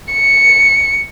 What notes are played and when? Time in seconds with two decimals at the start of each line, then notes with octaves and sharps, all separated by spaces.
0.13 C#7